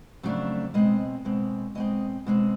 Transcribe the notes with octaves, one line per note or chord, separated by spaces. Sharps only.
F2 C#3 F#3 A3 D4
B2 G#3 C4 D#5
B2 G#3 C4
B2 G#3 C4 D#5
B2 G#3 C4